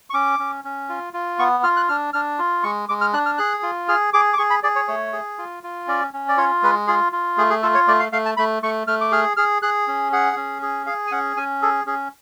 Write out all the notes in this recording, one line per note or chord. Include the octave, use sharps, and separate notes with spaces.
C#6
C#4 D6
C#4
C#4
F4
F4
B3 C#6
F4 F6
F#6
D4 F6
D4 F6
F4
G#3 C#6
G#3 D6
F6
D4 F#6
F6
G#4 F#6
F4
G#4 F6
G#4 D6
D6
G#4 C#6
B5
G#4 D5
C#5
A3 C#5
G#4
F4
F4
C#4 D5
C#4
D5
F4 C#5
G#3 B4
F4 G#4
F4
A3 G#4
G#4
F4 A4
C#5
A3 D5
F5
A3 F5
A5
A3 B5
A3 C#6
A3 F6
D6
G#4 F6
G#4 F6
G#4 F#6
C#4
G#4 F#5
C#4
G#4
G#4 F5
G#5
C#4 F#5
C#4 G#5
G#4 A4
C#4 G#4